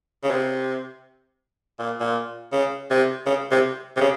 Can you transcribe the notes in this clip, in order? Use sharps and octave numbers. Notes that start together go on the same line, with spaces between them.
C#3
C3
A#2
A#2
C#3
C3
C#3
C3
C3
C#3